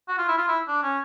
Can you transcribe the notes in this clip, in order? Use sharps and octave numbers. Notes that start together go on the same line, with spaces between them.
F#4
F4
E4
F4
E4
D4
C#4